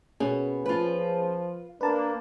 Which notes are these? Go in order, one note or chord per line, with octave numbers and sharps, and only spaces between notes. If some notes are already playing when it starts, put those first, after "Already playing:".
B2 A#3 C#4 G#4
F3 F4 B4
A#3 D4 B4 A5